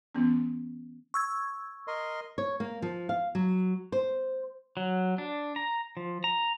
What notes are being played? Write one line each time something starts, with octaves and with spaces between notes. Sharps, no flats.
E3 B3 C#4
C#6 E6 G#6
A#4 D#5 C6
C#5
A#3
F3
F5
F#3
C5
F#3
D4
A#5
F3
A#5